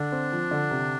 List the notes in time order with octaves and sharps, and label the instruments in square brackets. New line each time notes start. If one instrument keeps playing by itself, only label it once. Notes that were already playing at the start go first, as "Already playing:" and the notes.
Already playing: [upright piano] D3 [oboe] D4
[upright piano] C4
F3
D3
C3